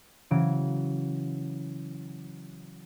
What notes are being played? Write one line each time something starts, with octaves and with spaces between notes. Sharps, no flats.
C#3 E3 F#3 D7